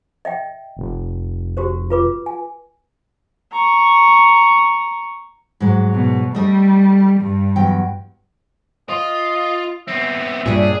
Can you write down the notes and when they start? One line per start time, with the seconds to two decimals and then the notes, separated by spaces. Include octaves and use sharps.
0.25 D#5 E5 G5
0.77 F1
1.57 F#4 G4 C5
1.90 F4 B4 D6
2.26 G#5
3.52 A#5 C#6
5.60 G#2 F#3
5.94 B2
6.35 G3 A3 D#5
7.21 G2
7.56 E2 F#3 G5
8.89 F4 D#5
9.88 B3 C4 E5
10.46 G2 A#2 G3 C#4 D4 G#4